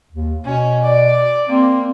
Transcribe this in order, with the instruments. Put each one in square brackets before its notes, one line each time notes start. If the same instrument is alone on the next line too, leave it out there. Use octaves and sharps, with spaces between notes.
[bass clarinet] D#2
[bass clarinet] B2 [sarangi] C#4
[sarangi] D5
[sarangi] A#3 [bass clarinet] C4